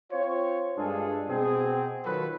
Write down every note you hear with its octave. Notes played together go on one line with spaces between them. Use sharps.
C4 F4 C5 C#5
G2 G#3 D4 F4 G#4 A4
B2 C4 G#4
D#3 F#3 F4 F#4 A4 B4